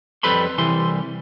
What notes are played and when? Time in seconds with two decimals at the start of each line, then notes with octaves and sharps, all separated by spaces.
0.23 F2 G3 A4 B4 B5 C6
0.58 C2 E3 G3 C6